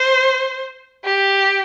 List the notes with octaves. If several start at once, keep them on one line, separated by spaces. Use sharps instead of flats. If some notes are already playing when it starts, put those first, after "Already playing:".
Already playing: C5
G4